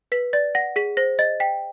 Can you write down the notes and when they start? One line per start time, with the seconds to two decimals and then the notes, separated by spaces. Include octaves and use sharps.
0.12 B4 B6
0.33 D5 A6
0.55 F#5 A#6
0.76 G#4 B6
0.97 C5 A#6
1.19 D#5 A6
1.40 G5 B6